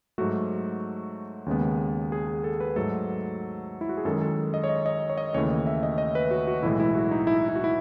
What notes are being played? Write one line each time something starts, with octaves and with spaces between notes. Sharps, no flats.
G#2 F#3 A3 F#4
D#2 C#3 G#3 B3
G#4
G#4
A4
B4
G#2 F#3 A3 A4
E4
F#4
G#4
F#2 D#3 G#3 A4
A4
D#5
C#5
D#5
D#5
C#5
D#5
D#2 C#3 E3 A3 C#5
D#5
E5
D#5
D#5
B4
F#4
F#4
B1 A2 E3 G#3 E4
E4
F#4
D#4
E4
E4
F#4
E4